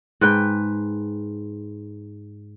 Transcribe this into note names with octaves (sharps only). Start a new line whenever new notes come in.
G#2 B4 G5